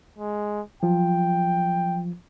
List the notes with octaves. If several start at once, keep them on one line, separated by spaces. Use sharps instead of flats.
G#3
F3 F#3 F4 G5